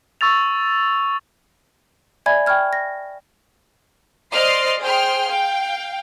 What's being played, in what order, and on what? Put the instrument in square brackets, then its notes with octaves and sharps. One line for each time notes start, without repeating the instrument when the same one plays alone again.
[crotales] C#6 E6 A6 F7
[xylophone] D5 E5 G#5 B5 G#6
G5 B5 C#6 F6 G#6
A#6
[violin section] C5 D5 D#5 C6 F6 C7
G#4 C5 G5 C6 F6
F5 G5